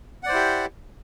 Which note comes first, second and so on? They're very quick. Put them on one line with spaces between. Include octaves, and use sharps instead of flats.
F#5 D5 C5 E4 G4